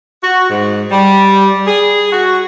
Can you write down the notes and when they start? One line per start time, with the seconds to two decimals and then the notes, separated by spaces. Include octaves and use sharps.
0.22 F#4
0.49 G#2
0.91 G3
1.67 G#4
2.12 F#4